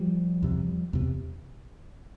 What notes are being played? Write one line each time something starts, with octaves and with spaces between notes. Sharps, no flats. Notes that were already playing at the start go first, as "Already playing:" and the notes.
Already playing: F3 G3
E2 C3
E2 C3